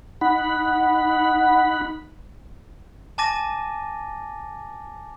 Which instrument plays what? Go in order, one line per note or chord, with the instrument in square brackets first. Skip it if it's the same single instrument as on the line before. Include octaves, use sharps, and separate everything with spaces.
[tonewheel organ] D#4 F#5 B5
[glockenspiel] G#5 A5 D6 A6 A#6 D#7